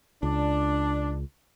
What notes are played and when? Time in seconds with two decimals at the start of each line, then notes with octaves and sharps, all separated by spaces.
0.23 C#2 D4